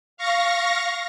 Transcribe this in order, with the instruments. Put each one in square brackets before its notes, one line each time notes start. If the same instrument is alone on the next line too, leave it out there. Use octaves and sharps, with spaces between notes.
[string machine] F5 C#6 A#6